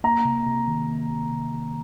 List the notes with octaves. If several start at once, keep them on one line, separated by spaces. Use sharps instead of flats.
A#3 A#5
C3
C3
D#3
A#3
C3
C3
D#3